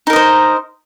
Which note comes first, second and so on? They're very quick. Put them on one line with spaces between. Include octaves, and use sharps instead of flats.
D#4 A#4 D#5 C5